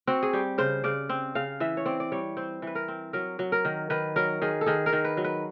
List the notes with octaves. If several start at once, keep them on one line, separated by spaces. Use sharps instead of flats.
C4 F#4
G#4
G3 G4
C#3 C5
C#3 D5
C4
C#3 F5
E3 E5
C#5
C4 D5
D5
G3 C#5
C4 C5
E3 B4
A#4
C4
F#3 A#4
F#3
A#4
D#3
D#3 B4
F#3 A#4
D#3 G#4
A4
D#3 G#4
A#4
D#3
B4
F#3
B4